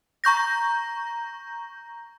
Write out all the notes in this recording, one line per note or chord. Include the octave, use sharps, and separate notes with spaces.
A#5 C#6 G6 A#6